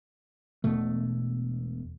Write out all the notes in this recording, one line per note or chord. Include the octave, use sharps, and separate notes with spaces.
E1 B2 A3